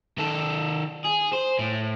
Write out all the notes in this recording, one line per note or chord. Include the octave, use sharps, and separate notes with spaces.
D#3 A4
G#4
C5
A2